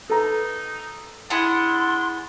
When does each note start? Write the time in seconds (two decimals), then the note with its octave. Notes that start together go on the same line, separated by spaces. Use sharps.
0.10 D#4 A4 B4 A#5
1.30 D4 E4 G#4 F#5 C6